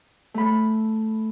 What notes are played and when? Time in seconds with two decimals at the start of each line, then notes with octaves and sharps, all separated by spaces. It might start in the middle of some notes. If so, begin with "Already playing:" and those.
0.34 A3 B5